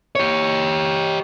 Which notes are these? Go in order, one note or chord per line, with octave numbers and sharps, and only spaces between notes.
G4 C#5